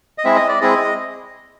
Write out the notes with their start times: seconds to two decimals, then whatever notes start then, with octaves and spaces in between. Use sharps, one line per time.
0.18 D#5
0.25 G#3 C4 E4 G#4 E5
0.37 D#5
0.48 D5
0.61 G#3 C4 E4 G#4 D#5